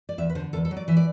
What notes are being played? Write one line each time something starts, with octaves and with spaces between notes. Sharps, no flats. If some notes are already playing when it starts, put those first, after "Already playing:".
D5
E2 E5
B4
D3 C5
E2 A4
A4
F#3
D5
E3 E5
D5